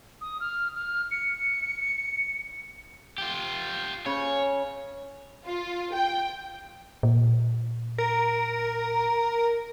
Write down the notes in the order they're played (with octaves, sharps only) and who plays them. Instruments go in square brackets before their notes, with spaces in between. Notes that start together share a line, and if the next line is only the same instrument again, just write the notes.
[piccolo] D#6
F6
F6
C#7
[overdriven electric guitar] F4 G4
[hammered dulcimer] C#3 [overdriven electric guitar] C#5
[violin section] F4
G5
[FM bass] A#2
[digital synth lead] A#4